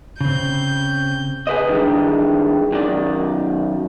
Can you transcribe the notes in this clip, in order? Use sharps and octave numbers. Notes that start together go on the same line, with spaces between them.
C#3 C4 G6
G#4 B4 C5 D#5
D#3 E3 G3 G#3 D4
F#2 D#3 D5